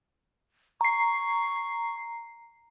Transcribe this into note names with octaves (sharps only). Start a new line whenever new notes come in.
A#5 C#6 C7